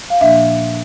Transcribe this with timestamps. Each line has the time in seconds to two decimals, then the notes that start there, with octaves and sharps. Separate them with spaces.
0.10 F5
0.21 A#2 F3 A#3 D4 E5